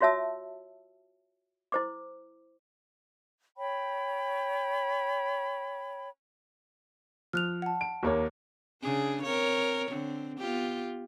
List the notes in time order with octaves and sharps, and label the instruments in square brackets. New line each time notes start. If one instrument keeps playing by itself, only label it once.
[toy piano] F4 F#4 C#5 E5 A5 E6
E4 C5 D6
[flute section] C#5 G5 B5
[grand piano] F3 [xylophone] F6 F#6 F7
[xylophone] F#5 A5
[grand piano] D7
D#2 A#3 C#5
[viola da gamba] C#3 D4 G#4
C4 A#4 C#5
D3 C4
B3 F4 G4